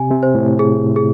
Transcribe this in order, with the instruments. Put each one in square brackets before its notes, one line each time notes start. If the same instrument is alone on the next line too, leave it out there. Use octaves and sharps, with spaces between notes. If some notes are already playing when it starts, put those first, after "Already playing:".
Already playing: [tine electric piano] C3 [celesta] G#5
[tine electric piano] C3
[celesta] C5
[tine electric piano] A2
[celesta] G#4
G#4